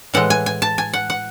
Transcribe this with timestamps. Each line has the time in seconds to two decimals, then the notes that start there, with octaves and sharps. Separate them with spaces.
0.14 A2 E3 G#3 F#5
0.30 G#5
0.46 G#5
0.62 A5
0.78 G#5
0.93 F#5
1.10 F#5